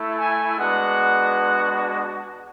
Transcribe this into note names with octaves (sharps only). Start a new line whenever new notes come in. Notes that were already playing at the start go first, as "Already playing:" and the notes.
Already playing: A3 E4
G#5
G#3 B3 D4 F#4 F#5